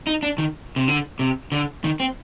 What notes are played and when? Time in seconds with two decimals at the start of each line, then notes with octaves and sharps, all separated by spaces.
0.07 D#4
0.23 D4
0.38 D#3
0.76 C3
0.88 D3
1.19 C3
1.52 D3
1.84 D#3
2.00 C4